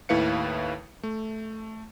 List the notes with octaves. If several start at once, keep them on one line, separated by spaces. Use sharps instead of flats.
D#2 A2 E4 B4 F5 C#7
A3